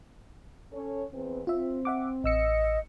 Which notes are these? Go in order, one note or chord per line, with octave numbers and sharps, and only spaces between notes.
C#4 A4 C#5
E2 C4 B4
C4 F4 E5
E5 F#5 D6
A1 D#5 E6 C#7